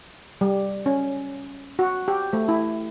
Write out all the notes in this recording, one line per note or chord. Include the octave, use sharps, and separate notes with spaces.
G3
C#4
F#4
G4
A3
E4